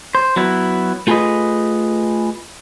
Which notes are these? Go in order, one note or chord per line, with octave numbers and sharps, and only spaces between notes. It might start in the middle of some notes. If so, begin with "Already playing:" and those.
C5
F#3 B3 E4
A3 F4 G#4 A4 B4 D#5